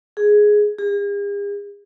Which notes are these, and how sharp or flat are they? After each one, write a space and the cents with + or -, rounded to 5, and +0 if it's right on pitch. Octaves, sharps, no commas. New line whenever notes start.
G#4 +5
G#4 -45